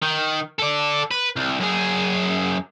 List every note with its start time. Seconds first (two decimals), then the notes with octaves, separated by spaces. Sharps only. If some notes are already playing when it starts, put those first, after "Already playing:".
0.02 D#3
0.59 A4 D5
1.11 B4
1.36 C2
1.60 F#2 G#4